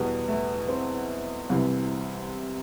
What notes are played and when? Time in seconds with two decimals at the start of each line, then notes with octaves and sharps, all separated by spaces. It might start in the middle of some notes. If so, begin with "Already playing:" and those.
Already playing: E2 B2 G3 B3
0.28 A3
0.68 C4
1.49 C2 C3 E3